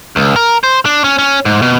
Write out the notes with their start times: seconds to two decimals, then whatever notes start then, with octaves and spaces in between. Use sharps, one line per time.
0.16 C#2
0.36 A#4
0.64 C5
0.85 D4
1.04 C#4
1.18 C#4
1.45 G#2
1.62 B2